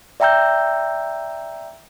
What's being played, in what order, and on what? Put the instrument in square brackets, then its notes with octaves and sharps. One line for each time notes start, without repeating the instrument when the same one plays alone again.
[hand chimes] D5 E5 G5 A#5 E6 G6